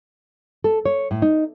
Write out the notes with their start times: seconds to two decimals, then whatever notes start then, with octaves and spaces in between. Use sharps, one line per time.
0.64 A4
0.85 C#5
1.11 A2
1.22 D#4